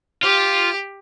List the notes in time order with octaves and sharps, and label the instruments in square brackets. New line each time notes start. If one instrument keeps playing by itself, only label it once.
[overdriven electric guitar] F4 [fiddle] G4